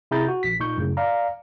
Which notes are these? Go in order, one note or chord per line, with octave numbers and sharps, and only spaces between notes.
C3 E4 G#4 A#5 G6 A6
F#4
A#1 B6
A#2 D#4 C#6 G6
F#2 A2 C#3
D5 F5 A#5